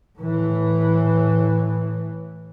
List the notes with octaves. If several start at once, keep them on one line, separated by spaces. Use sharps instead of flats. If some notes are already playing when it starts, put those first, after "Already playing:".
A2 E3